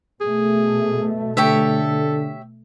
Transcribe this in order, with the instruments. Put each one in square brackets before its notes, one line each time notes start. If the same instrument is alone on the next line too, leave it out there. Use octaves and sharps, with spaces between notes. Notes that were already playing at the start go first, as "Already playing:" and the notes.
[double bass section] B2 A3 [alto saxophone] G#4
[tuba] D3 [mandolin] G4 C#5 E5 [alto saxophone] A4